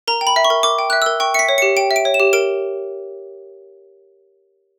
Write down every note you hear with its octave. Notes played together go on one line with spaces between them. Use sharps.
A#4 A#5
G5
B5
E5
C#6
A#4
A#4 D6
G5
E5 F#6
A#4 E6
G5 C#6
E5 B6 C#7
C#5
G4 C#7
G5 D7
E5
D7
C#5
E7
G4
A#4 D7